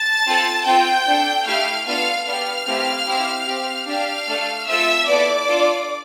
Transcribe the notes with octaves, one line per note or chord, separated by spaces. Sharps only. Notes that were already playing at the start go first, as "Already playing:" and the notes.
Already playing: A5 A6
C4 F4 A4
C4 F4 A4 G5 G6
D4 A4
A3 E4 G4 F5 F6
B3 D4 F4 A4 F5 F6
B3 D4 G4 F5 F6
A3 C4 E4 G4
C4 E4 G4
C4 G4
D4 G4 F5 F6
A3 D4 A4
A3 C4 F4 A4 E5 E6
B3 E4 A4 D5 D6
D4 F4 A4